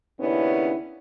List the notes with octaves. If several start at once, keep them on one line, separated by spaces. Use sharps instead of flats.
D#2 C#3 B3 C#4 D4 E4